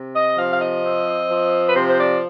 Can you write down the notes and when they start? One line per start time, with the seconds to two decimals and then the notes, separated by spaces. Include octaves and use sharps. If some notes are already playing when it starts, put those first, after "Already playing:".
Already playing: C3
0.14 D#5
0.38 F3 F5
0.53 F5
0.61 D#5
0.84 C4
1.30 F3
1.68 B4
1.75 C3 C5
1.88 C5
1.99 D5